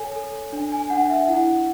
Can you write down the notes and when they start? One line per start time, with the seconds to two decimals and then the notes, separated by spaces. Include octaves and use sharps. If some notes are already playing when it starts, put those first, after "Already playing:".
Already playing: A4 C#5 G#5
0.16 A4
0.52 D4
0.72 G#5
0.90 D4 F#5
1.10 E5
1.28 E4 F#5